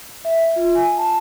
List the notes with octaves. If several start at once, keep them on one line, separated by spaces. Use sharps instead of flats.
E5
F4
G#5
A5